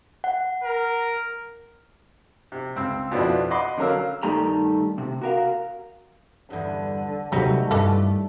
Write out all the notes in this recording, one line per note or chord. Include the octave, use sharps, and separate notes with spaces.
F#5
A#4
C3
C#2 C4 E6
F2 B2 B3 D4 E4
D#5 F#5 B5 C6 D6
D3 F#3 C#4 A#4 F5 E6
G2 D#3 A3 G4 A4 A#5
C3
F#4 A#4 F5
E2 G2 D3
D#2 C3 F#3 G3 A3 C4 D#4 F#4
G2 D3 E3 A4